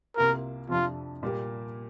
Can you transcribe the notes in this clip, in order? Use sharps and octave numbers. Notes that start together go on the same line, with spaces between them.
C2 C3 A#3 F4 A#4
F2 C3 F3 D4 F4
A#2 G3 A#3 G4